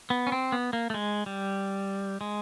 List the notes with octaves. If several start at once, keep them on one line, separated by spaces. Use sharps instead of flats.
B3
C#4
C4
B3
A#3
A3
G#3
G3
G#3